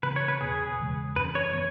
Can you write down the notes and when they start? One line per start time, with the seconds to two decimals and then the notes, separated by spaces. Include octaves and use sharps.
0.03 C#3 E3 B3 B4
0.16 C#5
0.28 B4
0.40 E2 B2 B3 G#4
0.78 E2 C#3 E3 G#3
1.16 F#2 E3 C#4 B4
1.35 C#5
1.53 E3 B3 C#5